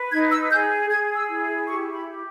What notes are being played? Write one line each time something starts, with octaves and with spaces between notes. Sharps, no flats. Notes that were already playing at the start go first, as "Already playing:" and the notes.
Already playing: B4
D#4 G#6
E6
G#4 G6
G#4 G#6
E6
E4
G4 C#6
B5
G4